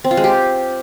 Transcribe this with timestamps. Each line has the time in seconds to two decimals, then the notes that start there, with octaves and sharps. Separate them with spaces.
0.04 C4
0.11 F4
0.17 G#3
0.24 G4